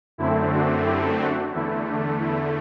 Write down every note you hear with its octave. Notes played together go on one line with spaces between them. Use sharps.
F#2 D3 A3 C4 E4
D4 F#4
E4 G4
D4 F#4
E2 D3 A3 E4
D4
E4